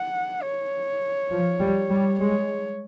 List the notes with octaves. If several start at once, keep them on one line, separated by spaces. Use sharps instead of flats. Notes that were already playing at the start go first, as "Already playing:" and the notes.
Already playing: F#5
C#5
F3
G3
G3
G#3 C#5